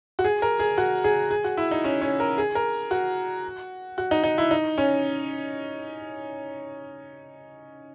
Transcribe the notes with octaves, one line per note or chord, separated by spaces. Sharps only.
F#4
G#4
A#4
G#4
F#4
G#4
G#4
F#4
E4
D#4
C#4
C#4
A#4
G#4
A#4
F#4
F#4
D#4
D#4
E4
D#4
C#4